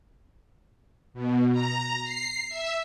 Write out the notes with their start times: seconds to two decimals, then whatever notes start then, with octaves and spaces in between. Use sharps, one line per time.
1.14 B2
1.52 A#5
2.03 C7
2.49 E5